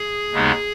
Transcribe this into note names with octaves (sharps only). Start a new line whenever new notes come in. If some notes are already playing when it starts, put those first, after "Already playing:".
Already playing: G#4
D#2 C#3 G#3 B3 D#4